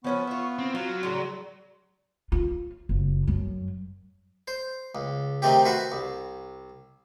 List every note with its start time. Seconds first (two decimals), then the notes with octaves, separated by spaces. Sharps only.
0.04 F3 B3 C#4 B4 C#6
0.27 F4 E5
0.59 C4
0.75 F#3 F4
1.03 A2 C#3 D5 C6
2.32 F4
2.89 F#1
3.27 F#2
4.48 C5
4.95 C#2
5.42 C3 D#3 A3 C4 G4
5.65 F#4 B4 C5 E5 F#5
5.92 C2